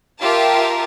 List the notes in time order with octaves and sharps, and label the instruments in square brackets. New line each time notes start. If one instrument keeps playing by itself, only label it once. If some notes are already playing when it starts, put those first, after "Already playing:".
[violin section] F4 G4 A#4 E5 A5